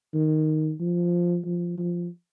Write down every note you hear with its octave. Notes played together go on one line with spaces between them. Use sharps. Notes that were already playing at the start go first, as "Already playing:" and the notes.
D#3
F3
F3
F3